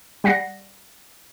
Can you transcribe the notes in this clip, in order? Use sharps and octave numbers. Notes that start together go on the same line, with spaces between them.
G3 F#5 A#6 C7